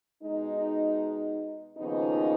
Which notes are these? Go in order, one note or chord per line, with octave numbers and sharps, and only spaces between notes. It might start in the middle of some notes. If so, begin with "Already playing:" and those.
B2 G#3 D#4
D#2 C#3 F3 B3 D#4